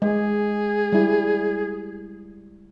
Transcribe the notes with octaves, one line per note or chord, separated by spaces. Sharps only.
G#3 G#4
G3 E4